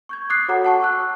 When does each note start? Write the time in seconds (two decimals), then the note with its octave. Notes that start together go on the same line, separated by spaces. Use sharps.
0.09 C#6 G6 G#6
0.30 D6 D#6 F#6 G#6 A6 C7
0.49 F#4 A4 C#5 F#5 A#5 D6
0.64 F#5 A5 C#6
0.81 C#6 E6 F#6